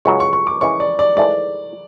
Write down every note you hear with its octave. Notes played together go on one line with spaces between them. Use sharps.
C#2 C#3 F#3 C#6
C#6
C#6
D6
C#3 E3 G#3 C#4 C#6
D5
D5
G#2 E3 A3 D5